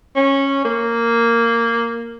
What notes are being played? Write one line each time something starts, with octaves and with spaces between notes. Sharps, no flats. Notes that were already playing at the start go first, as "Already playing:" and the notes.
C#4
A#3